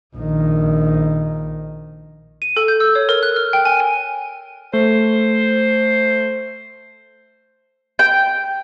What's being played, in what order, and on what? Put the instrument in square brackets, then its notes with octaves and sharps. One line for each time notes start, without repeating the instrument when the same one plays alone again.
[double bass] A#1 D#3
[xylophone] D#7
A4
G6
E6
C#5
A#4
F#6
F6
G5
G#5
G#5
[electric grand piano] A3 [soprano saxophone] C5
[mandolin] G5